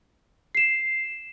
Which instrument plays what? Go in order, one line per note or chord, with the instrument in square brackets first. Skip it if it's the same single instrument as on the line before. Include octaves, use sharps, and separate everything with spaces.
[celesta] C7 E7